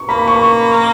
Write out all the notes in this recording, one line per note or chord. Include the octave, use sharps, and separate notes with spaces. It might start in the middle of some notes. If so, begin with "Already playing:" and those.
Already playing: C#6
A#3 B5
C#6